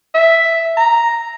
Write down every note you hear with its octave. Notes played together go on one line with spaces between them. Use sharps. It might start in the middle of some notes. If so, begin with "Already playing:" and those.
E5
A#5